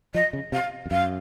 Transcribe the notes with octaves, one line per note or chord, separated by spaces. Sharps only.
F3 D#5
C#3
C3 F5
F2
F#2 F5